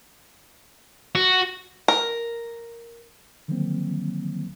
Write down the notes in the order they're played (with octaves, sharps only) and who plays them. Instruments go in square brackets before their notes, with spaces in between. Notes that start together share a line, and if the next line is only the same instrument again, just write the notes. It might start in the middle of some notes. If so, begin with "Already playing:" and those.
[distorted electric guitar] F#4
[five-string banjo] A#4
[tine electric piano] D3 D#3 F3 F#3 A#3 C4